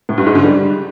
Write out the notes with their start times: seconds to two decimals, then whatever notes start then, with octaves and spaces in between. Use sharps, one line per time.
0.09 A2
0.18 G2
0.26 G#2
0.35 D3
0.44 G3